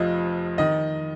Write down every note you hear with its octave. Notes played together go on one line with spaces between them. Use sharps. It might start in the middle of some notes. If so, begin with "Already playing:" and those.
Already playing: F1 F2 F3 D#5
D#3 D#5